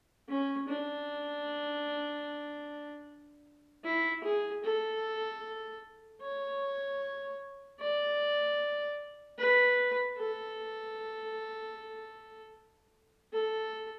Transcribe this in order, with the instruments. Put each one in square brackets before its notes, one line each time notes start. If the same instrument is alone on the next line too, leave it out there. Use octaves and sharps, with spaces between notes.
[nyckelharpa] C#4
D4
E4
G#4
A4
C#5
D5
B4
A4
A4